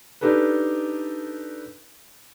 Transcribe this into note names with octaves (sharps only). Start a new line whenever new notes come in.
D4 D#4 G4 A4 B4